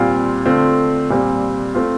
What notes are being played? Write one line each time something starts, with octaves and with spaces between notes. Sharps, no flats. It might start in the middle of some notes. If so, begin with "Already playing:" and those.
Already playing: A#2 G3 C4 F4
D3 A3 C4 F4
A#2 G3 C4
A3 C4 F4